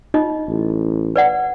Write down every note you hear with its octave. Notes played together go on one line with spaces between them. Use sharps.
D#4 F4 D#5
A1
B4 D5 F#5